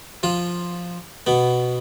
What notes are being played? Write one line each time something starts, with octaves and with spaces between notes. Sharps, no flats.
F3 F4
B2 B3